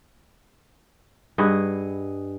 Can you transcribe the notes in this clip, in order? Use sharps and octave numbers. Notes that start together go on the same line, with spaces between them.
G2 G#4 D#5 F#5